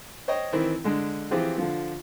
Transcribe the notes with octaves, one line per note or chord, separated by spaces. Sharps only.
C5 C#5 D#5 G5
D#3 E3 C4 E4
D3 G#3 D4
E3 F3 C4 F4 G4 G#4
D3 F3